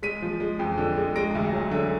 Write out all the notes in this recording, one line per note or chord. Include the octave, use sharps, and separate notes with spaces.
G#3 B6 D#7
F3
G#3
F2
D3
G#3
G#3 A#6 D7
D2
F#3
D3